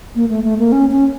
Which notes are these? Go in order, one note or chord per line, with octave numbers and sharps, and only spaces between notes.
A#3
A3
A3
A#3
C#4
C#4